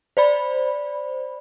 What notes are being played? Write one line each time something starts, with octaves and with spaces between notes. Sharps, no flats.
C5 D5 B5